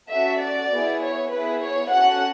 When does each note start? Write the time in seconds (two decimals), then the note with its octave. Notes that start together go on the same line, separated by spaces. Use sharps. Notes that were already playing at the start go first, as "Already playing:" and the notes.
0.11 C#4 F#4 A4 E5
0.41 D5
0.71 B3 E4 G#4
1.02 C#5
1.31 B3 E4 G#4 B4
1.62 C#5
1.92 C#4 F#4 A4 F#5